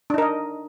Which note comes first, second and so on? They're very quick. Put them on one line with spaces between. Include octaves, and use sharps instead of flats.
D4 D#4 A#4 D#5